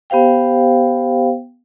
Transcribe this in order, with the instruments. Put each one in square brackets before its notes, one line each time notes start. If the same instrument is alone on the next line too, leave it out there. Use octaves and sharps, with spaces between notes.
[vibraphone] B3 G4 C5 F5 G5